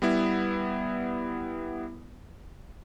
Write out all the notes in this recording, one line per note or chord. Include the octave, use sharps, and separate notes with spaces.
G3 B3 E4